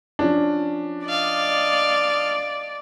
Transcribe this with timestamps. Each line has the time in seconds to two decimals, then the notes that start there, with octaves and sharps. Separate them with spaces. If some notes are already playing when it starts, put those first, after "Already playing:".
0.19 F3 C#4 D4
1.06 D5 D#5 F5